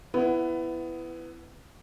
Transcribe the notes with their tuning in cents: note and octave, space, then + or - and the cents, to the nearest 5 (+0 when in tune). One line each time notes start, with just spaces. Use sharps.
B3 +15 E4 +15 F#5 +0